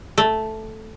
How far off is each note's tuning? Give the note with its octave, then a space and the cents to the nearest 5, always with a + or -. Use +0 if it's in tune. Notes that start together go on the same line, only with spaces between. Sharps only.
A3 -5